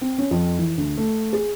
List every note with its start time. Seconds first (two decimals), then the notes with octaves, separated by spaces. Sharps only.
0.01 C4
0.18 C#4
0.31 F2
0.59 E3
0.78 D2
0.98 A3
1.33 G#4